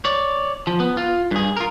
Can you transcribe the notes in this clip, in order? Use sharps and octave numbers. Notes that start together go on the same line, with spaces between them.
C#5 D5
F3
B3
F4
G2 G#4
F4 A#4